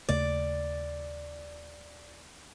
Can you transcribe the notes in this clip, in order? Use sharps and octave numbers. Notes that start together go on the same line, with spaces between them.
D#2 C#3 A3 D5